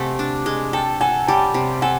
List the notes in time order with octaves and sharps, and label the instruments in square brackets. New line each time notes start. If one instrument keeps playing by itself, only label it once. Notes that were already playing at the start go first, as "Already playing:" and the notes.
Already playing: [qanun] C3 A3 [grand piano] F#5 G#5
[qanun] D4
G#3
[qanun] A4 [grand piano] G5 A5
[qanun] A4 [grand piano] F#5 G#5
[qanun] G3 [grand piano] G5 A5
[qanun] C3
[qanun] A4 [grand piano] F#5 G#5